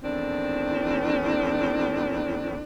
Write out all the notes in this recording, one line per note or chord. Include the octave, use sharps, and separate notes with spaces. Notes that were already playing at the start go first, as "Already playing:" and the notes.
E2 A2 D#3 C4 D4